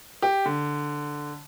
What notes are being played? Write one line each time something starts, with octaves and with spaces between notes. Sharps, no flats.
G4
D3